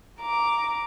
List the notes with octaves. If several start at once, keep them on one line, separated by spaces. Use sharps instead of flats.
A#5 D6